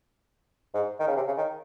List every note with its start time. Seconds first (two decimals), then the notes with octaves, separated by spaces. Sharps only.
0.74 G#2
1.00 D#3
1.08 C#3
1.16 C3
1.27 C#3
1.38 D#3